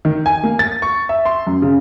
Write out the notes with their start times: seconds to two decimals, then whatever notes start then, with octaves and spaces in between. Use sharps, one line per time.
0.05 D#3
0.26 G#5
0.44 A#3
0.59 A6
0.82 C#6
1.09 E5
1.26 C6
1.47 F#2
1.62 C#3